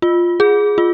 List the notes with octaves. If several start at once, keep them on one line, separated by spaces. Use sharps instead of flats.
F4
G#4
F4